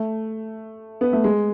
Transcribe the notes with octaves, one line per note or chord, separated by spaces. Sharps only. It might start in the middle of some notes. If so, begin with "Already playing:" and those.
Already playing: A3
B3
A3
G#3